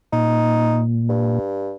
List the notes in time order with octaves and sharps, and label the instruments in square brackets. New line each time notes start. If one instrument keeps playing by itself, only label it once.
[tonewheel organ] A#2 [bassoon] D#4
[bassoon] G2